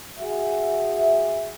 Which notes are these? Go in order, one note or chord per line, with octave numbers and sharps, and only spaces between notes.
F#4 G#4 E5